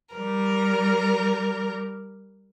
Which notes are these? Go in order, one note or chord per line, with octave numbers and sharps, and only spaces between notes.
G3 A#4